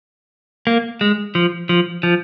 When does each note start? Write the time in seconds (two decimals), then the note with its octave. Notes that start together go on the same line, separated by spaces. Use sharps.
0.67 A#3
1.01 G#3
1.35 F3
1.69 F3
2.03 F3